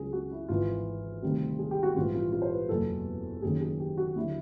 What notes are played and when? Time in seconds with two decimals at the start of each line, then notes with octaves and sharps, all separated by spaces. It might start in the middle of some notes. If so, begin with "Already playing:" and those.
Already playing: C#2 C#3 F#3 G#4
0.13 F#4
0.31 E4
0.49 G#1 G#2 E3 F4
1.22 D2 C3 D#3 G3
1.59 G#4
1.71 G4
1.83 F#4
1.96 A#1 G#2 E3 G3 F4
2.15 F4
2.32 F4
2.42 C5
2.51 B4
2.69 F#1 E2 B2 F#3 A4
3.42 F#1 F#2 D#3 G#4
3.61 G#4
3.80 G4
3.98 F#4
4.16 D#2 D3 F#3 E4